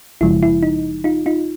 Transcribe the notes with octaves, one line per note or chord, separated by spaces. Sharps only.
G1 F#2 C#3 F3 G#3 E4
E4
D#4
D#4 F4
D#4 F4